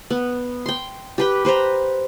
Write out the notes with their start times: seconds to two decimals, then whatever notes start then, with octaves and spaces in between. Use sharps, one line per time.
0.10 B3
0.66 G5 C6
1.18 G4 B4 G5
1.45 B4 C5 G5 A#5